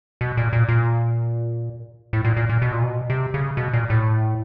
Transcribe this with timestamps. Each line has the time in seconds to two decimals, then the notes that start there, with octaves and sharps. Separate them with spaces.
0.21 B2
0.37 A#2
0.53 A#2
0.69 A#2
2.13 A2
2.25 A#2
2.37 A#2
2.49 A#2
2.62 B2
2.72 A#2
2.83 B2
3.10 C3
3.34 C#3
3.57 B2
3.73 A#2
3.90 A2